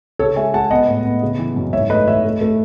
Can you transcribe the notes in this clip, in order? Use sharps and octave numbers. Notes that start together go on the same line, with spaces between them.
C#3 A4 C#5
G#3 E5 G#5
G#3 F#5 A5
B3 D#5 F#5
A2
B3
C#3
E3
F#2
G#2 C#5 E5
A3 B4 D#5
E3 C#5 E5
A3
A3